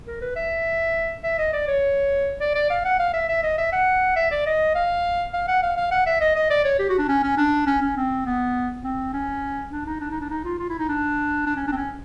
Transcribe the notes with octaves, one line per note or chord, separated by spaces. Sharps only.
A#4
B4
E5
E5
D#5
D5
C#5
D5
D5
F5
F#5
F5
E5
E5
D#5
E5
F#5
E5
D5
D#5
F5
F5
F#5
F5
F5
F#5
E5
D#5
D#5
D5
C#5
G4
F#4
D4
C#4
C#4
D4
C#4
C#4
C4
B3
C4
C#4
D4
D#4
D4
D#4
D4
D#4
F4
F4
E4
D#4
D4
D4
C#4
D4
C4
C#4